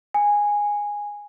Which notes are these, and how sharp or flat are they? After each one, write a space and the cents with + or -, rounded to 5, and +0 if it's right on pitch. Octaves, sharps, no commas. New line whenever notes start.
G#5 -10